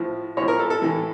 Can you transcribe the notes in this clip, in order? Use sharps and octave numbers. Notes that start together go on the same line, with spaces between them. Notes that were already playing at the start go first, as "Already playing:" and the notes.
Already playing: A2 F3
A2 F3 C#5
A#4
A4
A4
A2 E3